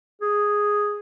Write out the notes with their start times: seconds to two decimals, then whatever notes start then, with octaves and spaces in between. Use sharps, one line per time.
0.21 G#4